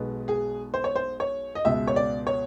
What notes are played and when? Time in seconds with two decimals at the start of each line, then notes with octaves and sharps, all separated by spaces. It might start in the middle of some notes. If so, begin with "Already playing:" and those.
Already playing: B1 B2 G#3 B3
0.28 G#4
0.74 C5
0.84 C#5
0.96 C5
1.20 C#5
1.55 D#5
1.65 C#2 B2 G#3 B3 E5
1.87 C#5
1.96 D5
2.27 C#5